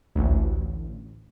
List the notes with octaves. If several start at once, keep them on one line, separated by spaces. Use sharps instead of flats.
A1 D2